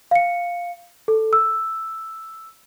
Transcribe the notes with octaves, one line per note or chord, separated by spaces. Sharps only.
F5 C#7
A4
E6